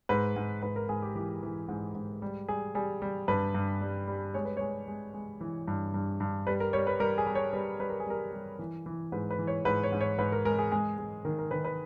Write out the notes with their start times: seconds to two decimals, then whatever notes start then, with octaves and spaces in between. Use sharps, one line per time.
0.09 G#2 B4
0.36 G#2
0.62 G#2 B4
0.76 A#4
0.89 G#2 G#4
1.02 G4
1.15 E3 G4
1.43 E3
1.69 G#2
1.95 G#2
2.22 G3
2.48 G3 G#4
2.75 G3 G#4
3.02 G3
3.28 G2 B4
3.55 G2
3.81 G3
4.08 G3
4.34 G#3 C#5
4.45 B4
4.57 G#3 C#5
4.88 G#3
5.14 G#3
5.41 E3
5.68 G2
5.94 G2
6.20 G2
6.47 G3 B4
6.60 A#4
6.73 G3 C#5
6.87 B4
7.00 G3 A#4
7.18 G#4
7.27 G3
7.35 C#5
7.53 G3 B4
7.80 G3 B4
7.90 A#4
8.00 G#4
8.07 G3 A#4
8.33 G3
8.59 E3
8.86 E3
9.12 G#2 B4
9.31 B4
9.39 E3
9.47 C#5
9.65 G#2 B4
9.83 C#5
9.92 G#2
10.01 C#5
10.18 G#2 B4
10.32 A#4
10.45 G#3 A#4
10.59 G#4
10.72 G#3 G#4
10.98 G#3
11.25 D#3 A#4
11.38 A#4
11.51 D#3 B4
11.65 B4